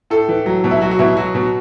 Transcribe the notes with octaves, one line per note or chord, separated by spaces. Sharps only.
A2 A4
E3
F#3
B2
E4
F#3 F#4
F#4
B2 E4
F#3 F#4
B2